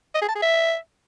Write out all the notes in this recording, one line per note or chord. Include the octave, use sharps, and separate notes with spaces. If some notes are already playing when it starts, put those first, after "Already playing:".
D#5
G#4
A5
G#4
E5